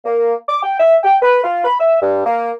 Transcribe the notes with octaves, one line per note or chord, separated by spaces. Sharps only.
A#3
D6
G5
E5
G5
B4
F4
B5
E5
G2
A#3